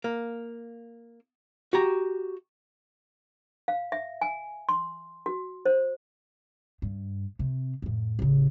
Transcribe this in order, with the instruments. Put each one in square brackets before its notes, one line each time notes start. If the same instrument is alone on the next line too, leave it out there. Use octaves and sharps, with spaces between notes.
[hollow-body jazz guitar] A#3
F#4 G4 A#5
[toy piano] F5
E5
G#5
C6
F#4
C5
[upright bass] G2
C3
F2 A2
A1 C#3